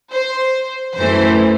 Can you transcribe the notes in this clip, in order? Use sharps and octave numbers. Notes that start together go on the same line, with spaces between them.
C5
F#2 E3 A3 C5